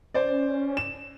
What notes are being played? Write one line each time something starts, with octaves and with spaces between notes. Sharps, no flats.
C#4 C5 D5
E7